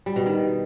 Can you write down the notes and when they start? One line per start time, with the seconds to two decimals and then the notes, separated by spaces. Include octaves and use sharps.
0.06 G3
0.16 B2
0.26 D#3